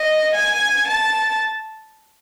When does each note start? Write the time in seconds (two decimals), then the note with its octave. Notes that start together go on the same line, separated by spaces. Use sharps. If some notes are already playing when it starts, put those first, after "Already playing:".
Already playing: D#5
0.35 G#5
0.88 A5